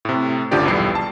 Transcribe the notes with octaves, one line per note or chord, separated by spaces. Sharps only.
A2 C3
G1 C#2 D3 F3 G4 D5
B1 E2 G3 C7
A5